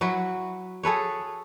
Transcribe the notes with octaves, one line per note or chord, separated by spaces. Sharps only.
F#3 E4 F#4 B4
G#4 A4 B4 C#5